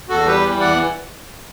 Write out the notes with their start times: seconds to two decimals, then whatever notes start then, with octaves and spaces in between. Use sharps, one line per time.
0.09 E2 F#4 A4
0.26 G3 G4 B4
0.44 E3
0.60 E2 D5 F#5